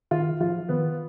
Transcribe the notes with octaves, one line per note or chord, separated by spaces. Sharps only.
D#3 F4
F3 F4
D#3 B3